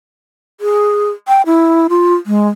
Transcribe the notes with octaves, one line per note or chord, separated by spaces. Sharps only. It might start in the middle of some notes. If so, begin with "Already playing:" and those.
G#4
G5
E4
F4
G#3